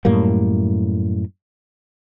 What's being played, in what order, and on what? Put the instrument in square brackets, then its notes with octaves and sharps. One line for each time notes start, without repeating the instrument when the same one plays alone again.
[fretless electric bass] F#2 A2 G3 A#3